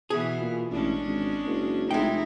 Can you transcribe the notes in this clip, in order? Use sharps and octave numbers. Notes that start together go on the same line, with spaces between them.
B2 E3 B3 G#4
A#2
A1 G#3 C#4 D4
G#1
F#1
F1 G#3 D#4 E4 G5